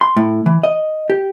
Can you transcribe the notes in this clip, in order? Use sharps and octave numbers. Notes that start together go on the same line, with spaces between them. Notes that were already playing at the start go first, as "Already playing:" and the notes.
C6
A2
E3
D#5
G4